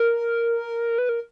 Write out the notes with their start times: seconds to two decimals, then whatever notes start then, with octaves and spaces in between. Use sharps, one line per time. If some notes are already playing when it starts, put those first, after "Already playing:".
Already playing: A#4
0.98 B4
1.09 A#4